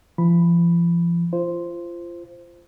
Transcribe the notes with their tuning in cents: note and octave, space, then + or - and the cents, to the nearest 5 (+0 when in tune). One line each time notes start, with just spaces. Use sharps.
F3 -40 B5 +0
F4 -25 C5 +0